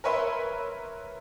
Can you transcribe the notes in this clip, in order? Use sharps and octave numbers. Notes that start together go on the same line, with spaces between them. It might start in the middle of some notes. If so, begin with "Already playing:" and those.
A#4 B4 C#5 E5 B5 C6